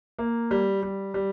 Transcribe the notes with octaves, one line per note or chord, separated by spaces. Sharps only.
A#3
G3
G3
G3